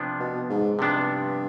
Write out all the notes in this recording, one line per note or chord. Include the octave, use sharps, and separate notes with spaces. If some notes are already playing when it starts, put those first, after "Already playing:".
Already playing: C3 F3 B3 D4
B2
G#2
G2 C3 F3 B3 D4